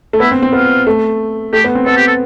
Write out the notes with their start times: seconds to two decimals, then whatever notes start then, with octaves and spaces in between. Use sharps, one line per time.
0.13 A3
0.20 B3 E4
0.31 C4
0.42 C4
0.53 B3 F4
0.87 A3
1.53 A3 G4
1.64 B3
1.75 C4
1.86 B3 A4
1.97 G4
2.07 A4